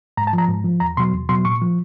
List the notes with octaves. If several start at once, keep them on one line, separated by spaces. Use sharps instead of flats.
G#2 A#5
A5
F3
A#5
G#2
F3
E2 A#5
B2 F#3 C6
E2
B2 F#3 C6
A#2 C#6
F3